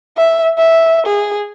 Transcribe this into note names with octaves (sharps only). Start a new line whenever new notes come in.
E5
E5
G#4